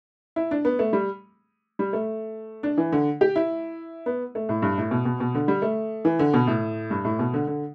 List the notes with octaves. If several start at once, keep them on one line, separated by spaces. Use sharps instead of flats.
E4
D4
B3
A3
G3
G3
A3
D4
E3
D3
G4
E4
B3
A3
A2
G2
A2
B2
B2
B2
D3
G3
A3
E3
D3
B2
A2
G2
A2
B2
D3
D3